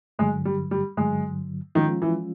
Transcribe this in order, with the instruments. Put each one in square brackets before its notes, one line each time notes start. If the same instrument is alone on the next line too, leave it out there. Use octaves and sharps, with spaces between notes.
[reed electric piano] G2 D3 F#3 [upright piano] G#3
[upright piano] G3
G3
[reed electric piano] G2 D3 F#3 [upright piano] G#3
[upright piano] D#3 [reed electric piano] F3 G#3 C#4 F4
[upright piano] E3